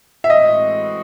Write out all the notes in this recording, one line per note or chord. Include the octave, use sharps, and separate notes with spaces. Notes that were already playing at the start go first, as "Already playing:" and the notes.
E5
A2 E3 G#3 C4 F#4 D#5